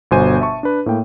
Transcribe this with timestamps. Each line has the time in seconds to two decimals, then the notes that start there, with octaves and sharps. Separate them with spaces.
0.11 G1 B2 F#4 C5 G#5 D#7
0.41 E5 A5 C#6
0.63 D4 B4
0.86 A2 A#3 G5